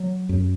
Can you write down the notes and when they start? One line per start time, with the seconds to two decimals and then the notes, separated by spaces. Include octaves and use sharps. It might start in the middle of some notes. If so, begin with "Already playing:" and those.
Already playing: F#3
0.29 F#2